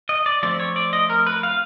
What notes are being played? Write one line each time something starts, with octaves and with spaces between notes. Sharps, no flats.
D#5
D5
F3 A3 C4 D5
C#5
D5
D#5
A#4
B4
F5